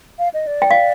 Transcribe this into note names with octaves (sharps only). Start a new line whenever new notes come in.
F5
D#5
D5
G5
F5